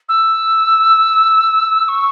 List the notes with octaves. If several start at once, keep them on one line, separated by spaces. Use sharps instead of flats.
E6
C#6